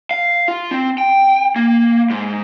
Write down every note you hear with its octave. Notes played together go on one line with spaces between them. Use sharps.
F5
F4
C4
G5
A#3
G#2